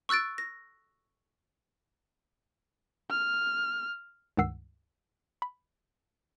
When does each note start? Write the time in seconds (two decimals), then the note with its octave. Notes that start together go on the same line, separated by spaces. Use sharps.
0.09 C#6 E6 F#6 A6 D7
0.38 A#6
3.10 F6
4.37 C#2 G2 D#3 F#5 E6 C7
5.42 B5